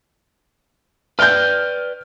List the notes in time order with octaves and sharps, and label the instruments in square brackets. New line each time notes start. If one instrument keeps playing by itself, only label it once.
[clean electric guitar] B4 D5 G5 [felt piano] F6 G6